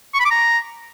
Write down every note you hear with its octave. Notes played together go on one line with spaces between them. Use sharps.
C#6
B5
D6
A#5